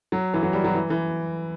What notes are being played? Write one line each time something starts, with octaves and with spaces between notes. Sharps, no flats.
F#3
E3
F#3
G3
F#3
E3
E3